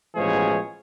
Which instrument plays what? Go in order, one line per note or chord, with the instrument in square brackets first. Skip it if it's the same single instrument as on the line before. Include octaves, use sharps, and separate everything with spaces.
[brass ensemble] A1 B2 F3 G#3 G#4 C#5